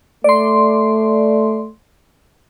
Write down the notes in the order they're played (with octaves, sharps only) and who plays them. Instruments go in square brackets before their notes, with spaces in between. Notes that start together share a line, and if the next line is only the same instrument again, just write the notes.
[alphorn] A3 [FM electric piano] D5 C6